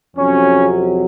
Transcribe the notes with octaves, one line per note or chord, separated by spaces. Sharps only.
F2 C3 F#3 C#4